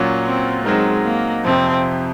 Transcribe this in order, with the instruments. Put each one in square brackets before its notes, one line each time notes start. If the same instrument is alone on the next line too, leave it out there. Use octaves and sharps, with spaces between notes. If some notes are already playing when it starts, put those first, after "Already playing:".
Already playing: [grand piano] A#2 F#3 C#4 F4
[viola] C4
[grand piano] F#3 C4 D#4 A#4 [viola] G#3
[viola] A#3
[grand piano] F2 C3 F3 [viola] C4